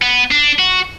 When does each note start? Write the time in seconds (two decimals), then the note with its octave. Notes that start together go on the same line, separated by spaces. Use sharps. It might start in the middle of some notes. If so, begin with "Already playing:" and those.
0.02 B3
0.31 D4
0.59 F#4